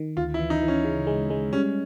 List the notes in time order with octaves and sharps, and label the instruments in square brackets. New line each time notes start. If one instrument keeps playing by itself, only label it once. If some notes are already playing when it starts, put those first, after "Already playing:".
Already playing: [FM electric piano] D#3
[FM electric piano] D2 [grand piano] F4
[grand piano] E4
[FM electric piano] E3
[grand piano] D#4
[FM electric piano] E3
[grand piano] C#4
[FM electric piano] C#3
G#3
G#3
[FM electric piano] G3 [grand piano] C#4